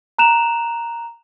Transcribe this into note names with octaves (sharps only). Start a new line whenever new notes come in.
A#5 F#6 E7 F7